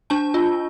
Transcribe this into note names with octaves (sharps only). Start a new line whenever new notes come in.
D4 A5
F4